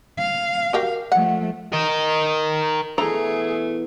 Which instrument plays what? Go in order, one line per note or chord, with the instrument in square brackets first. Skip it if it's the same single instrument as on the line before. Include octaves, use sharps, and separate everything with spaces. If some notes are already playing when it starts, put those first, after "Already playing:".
[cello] F5
[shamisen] F#4 G4 A#4
[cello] F3 A3 [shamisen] F#5
[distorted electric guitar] A#4 D#5
[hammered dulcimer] B2 E3 [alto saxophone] A3 [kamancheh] G#4 [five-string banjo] A4 A#5